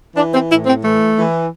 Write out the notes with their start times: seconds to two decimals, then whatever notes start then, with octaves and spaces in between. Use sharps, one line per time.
0.15 E3 D4
0.33 C4
0.49 A2 E4
0.66 C4
0.82 E3 A3
1.16 E3